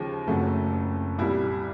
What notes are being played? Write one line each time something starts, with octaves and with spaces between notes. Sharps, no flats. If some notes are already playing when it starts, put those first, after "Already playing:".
Already playing: D#2 C#3 F3 G#3
F#1 F2 C#3 F#3 A3
C2 A#2 G3 E4